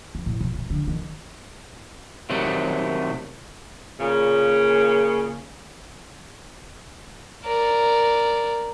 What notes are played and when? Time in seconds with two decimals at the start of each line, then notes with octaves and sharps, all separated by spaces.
0.15 F#3
0.26 A2
0.41 C3
0.54 F#3
0.70 D3
0.87 D#3
2.30 C3 D#3 F#3 A3
3.99 A#2 C#3
7.45 A#4 D5